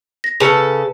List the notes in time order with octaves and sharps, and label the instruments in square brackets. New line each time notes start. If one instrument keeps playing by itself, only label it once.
[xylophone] A#6
[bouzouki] C#3 A4 [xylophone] B4 A5 C#7